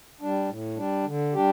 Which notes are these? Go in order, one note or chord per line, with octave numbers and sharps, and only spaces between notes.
G3 D4
A2
G3 D4
D3
G3 D4 G4